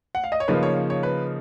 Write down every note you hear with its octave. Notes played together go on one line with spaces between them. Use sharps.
F#5
F5
D#5
C#5
C#3 F3 A#3 D#4 B4
C#5
C#5
C#5
B4